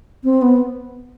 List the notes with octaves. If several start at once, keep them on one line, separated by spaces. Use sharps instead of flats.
C4
B3